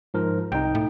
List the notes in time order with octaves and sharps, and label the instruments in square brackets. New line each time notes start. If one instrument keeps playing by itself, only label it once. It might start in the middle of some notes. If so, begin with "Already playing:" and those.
[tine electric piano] G#2 F3 A#4
[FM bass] C2 [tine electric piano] D#4 G5
[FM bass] A2